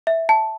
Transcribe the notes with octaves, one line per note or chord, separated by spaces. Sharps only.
E5
A5